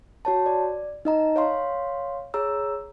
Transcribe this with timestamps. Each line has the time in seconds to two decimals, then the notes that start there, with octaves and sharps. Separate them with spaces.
0.25 F#4 C#5 A5
0.46 D5
1.05 D#4 D#5 A#5
1.36 C#5 F5 C6
2.34 G#4 C#5 A#5 E6